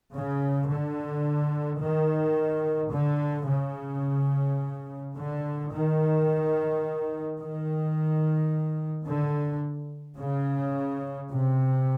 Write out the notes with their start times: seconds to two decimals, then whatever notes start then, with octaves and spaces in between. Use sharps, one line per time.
0.13 C#3
0.69 D3
1.81 D#3
2.92 D3
3.48 C#3
5.16 D3
5.72 D#3
7.39 D#3
9.06 D3
10.17 C#3
11.30 C3